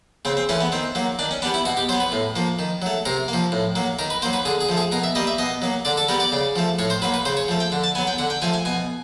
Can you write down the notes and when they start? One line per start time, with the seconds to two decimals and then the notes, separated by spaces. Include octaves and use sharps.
0.25 C#3 C4
0.37 C4
0.49 E3 A3 C#4
0.61 B3
0.72 D#3 C4
0.95 F#3 A#3
1.19 D#3 D4
1.31 C#4
1.42 B3 D4
1.45 G3
1.54 E4
1.65 B2 F#4
1.77 G4
1.89 F#3 C5
1.93 B3
2.00 B4
2.12 A2
2.36 F3 A#3
2.59 D#3
2.82 F#3 A3
3.05 C3 A#4
3.28 A#3
3.33 F3
3.52 A2
3.75 F#3 A#3
3.99 D#3 A#4
4.10 B4
4.22 F#3 A#3 C5
4.33 B4
4.45 D3 G#4
4.61 G#4
4.69 F3 A3
4.77 G#4
4.92 B2 A#4
5.03 E5
5.15 G3 A#3 D#5
5.27 E5
5.38 B2 D#5
5.62 F#3 A#3
5.85 D3 D5
5.97 A4
6.08 G3 B3 A#4
6.20 D5
6.32 C#3
6.56 F3 A3
6.79 A2 C#5
6.90 C5
7.02 F#3 A#3 B4
7.14 B4
7.25 C#3 C5
7.37 C#5
7.48 F3 A3
7.60 G5
7.72 D3
7.84 A5
7.95 F#3 B3 G#5
8.07 G5
8.18 D3 F#5
8.30 G5
8.42 F3 A3 G#5
8.54 G#5
8.65 B2 G#5